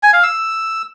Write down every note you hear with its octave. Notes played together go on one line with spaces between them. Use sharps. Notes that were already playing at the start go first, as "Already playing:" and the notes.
G#5
F5
E6